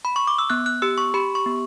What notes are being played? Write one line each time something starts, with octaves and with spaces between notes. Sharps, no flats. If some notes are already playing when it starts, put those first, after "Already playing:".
B5
C#6
D6
E6
B3 F#6
F#6
G4 E6
C#6
G4 B5
C#6
B3